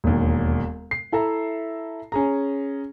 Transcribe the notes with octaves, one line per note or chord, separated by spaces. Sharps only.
E1 D#2
C7
E4 A4 E5 A#5
C#4 G#4 A#5